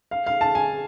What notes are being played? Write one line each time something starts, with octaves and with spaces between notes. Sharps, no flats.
F5
F5
A5
G#5